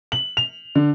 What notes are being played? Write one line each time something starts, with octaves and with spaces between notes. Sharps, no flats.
F#7
F7
D3